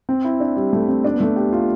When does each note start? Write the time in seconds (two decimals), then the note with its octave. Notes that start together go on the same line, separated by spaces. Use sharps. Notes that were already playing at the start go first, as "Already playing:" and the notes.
0.09 C4
0.24 E4
0.40 D4
0.56 G3
0.73 A3
0.88 C4
1.04 D4
1.14 B3
1.20 A3
1.36 G4
1.52 F4